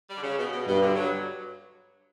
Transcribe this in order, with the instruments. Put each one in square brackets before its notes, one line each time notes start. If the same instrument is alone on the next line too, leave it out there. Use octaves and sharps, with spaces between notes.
[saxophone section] G3
D3
C#3
B2
B2
[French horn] G2 [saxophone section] B2
[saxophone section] D3
F#3